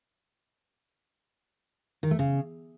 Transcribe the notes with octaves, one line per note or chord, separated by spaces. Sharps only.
D#3
A3
C#3